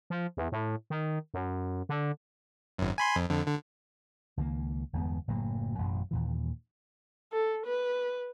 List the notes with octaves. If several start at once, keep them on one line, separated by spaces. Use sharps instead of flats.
F3
E2
A2
D#3
F#2
D3
G#1 F#2
G#5 B5 C6
F2
F2 D3
D3
C#2 D#3 E3 A#3
G1 E2 G#3 B3
F#1 A2 F#3 A#3
A1 F#2 B2
D#2 A#2 E3
A4
B4